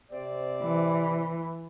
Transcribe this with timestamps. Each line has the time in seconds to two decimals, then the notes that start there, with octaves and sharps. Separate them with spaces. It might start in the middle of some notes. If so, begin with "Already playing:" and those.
0.12 C3 C4 D5
0.63 E3